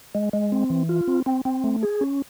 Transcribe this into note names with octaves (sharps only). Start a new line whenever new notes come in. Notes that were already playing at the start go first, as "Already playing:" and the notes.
G#3
G#3
C4
E3
F4
C4
C4
C4
A3
G#4
C#4